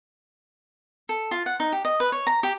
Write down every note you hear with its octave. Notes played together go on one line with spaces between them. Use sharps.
A4
F4
F#5
D#4
G4
D#5
B4
C#5
A#5
G4